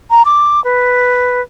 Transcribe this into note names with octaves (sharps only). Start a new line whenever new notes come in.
A#5
D6
B4